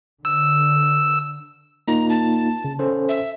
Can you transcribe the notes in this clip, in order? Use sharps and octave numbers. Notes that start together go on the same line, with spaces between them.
D3 E6
A#3 D#4 F4 A#5
A5
C#3
C#4 A4 C5
E5